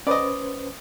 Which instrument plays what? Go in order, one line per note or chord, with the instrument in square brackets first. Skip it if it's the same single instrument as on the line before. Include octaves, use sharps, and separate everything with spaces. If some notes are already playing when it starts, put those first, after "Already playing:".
[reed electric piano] C#4 B4 C5 [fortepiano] D5 D#5